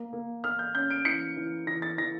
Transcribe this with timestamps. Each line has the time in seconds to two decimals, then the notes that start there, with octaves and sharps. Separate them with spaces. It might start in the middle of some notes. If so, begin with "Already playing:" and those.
Already playing: A#3
0.13 A#3
0.44 A#3 F6
0.59 G6
0.75 C#4 G6
0.90 D7
1.05 E3 C#7
1.37 E3
1.67 E3 A#6
1.82 A6
1.98 E3 A#6